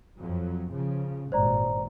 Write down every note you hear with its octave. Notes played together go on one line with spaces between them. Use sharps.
F2 F#3
C#3 F3
G#1 G2 A#2 C5 D5 A#5